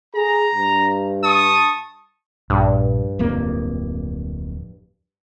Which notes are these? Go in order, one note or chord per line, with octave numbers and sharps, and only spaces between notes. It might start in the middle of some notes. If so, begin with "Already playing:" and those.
G#4 A#5
G2
A5 C#6 D#6
A#1 G2
D1 F2 A#3